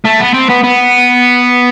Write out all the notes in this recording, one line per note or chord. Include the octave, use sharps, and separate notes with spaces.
A3
B3
C4
B3
B3